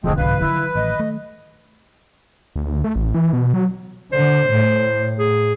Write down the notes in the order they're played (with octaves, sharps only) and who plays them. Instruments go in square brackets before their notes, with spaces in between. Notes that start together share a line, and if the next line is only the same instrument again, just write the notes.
[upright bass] E1 F#2 [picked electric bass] D3 F3 [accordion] G#3 A3 C4 [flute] G#4
[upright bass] C2 G#2 [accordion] B4 [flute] F5
[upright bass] D#3 F#3 [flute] E4
[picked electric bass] A1 [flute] D#5
[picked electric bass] A3
[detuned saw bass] D2
A3
A1
E3
B2
F#3
[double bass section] D3 [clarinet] C5
[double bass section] A2
[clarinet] G#4